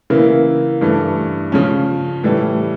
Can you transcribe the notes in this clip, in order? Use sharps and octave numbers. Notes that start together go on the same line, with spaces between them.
C#3 E3 A#3 E4
G2 E3 A3
C#3 F3 C#4
A2 E3 G3